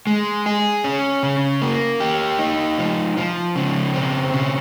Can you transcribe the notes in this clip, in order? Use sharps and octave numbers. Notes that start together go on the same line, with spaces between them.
G#3
G#4
C#4
C#3
A#3
G4
D#4
F3
F3
C#3
C4
C#3